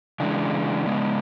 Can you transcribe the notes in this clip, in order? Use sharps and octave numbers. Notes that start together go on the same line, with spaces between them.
C#3 E3 G#3 D4
C#3 G#3 B3